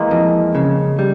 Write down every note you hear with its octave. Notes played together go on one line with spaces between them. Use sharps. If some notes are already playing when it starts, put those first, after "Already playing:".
Already playing: E3 G#3 A#3
F2
C#3
G3